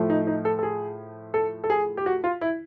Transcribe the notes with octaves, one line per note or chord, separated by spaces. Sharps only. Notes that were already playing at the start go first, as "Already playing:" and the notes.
Already playing: A2 F3 A3
D#4
D#4
A4
A4
G#4
A4
A4
G#4
G4
F#4
F4
E4